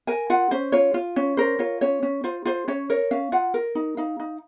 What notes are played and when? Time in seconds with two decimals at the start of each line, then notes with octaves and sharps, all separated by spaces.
0.07 A#4 G#5
0.30 F4 F#5
0.51 C#4 C5
0.72 F4 C#5
0.94 F4
1.16 C#4 C#5
1.37 A#4 C5
1.59 F4 C#5
1.81 C#4 C#5
2.03 C#4
2.24 F4 C5
2.45 F4 C5
2.68 C#4 C#5
2.90 A#4 C#5
3.11 C#4 F5
3.32 F4 F#5
3.54 A#4
3.75 D#4
3.97 D#4 F5
4.20 D#4